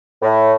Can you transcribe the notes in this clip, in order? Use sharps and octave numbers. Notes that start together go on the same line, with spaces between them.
A2